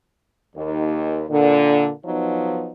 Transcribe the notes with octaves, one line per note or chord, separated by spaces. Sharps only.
D#2
A#2 D3
F3 F#3 B3 D#4